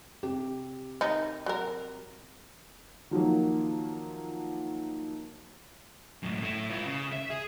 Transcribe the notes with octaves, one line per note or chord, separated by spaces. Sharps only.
C3 G4
D#3 D#4
F#3 A#4
D#3 F3 F#3 A#3
F#2 A2
A3 E4
F4 B4
C#3
E5
G#4